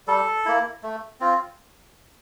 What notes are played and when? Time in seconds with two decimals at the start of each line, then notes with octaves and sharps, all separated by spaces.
0.07 G3 A4
0.46 A#3 E4
0.83 A3
1.20 C4 F4